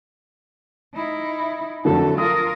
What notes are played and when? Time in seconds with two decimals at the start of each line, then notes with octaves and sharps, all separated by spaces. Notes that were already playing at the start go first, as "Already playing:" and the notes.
0.95 D#4 E4
1.85 F2 D3 F#3 A3 A4
2.18 F4 A#4 D#6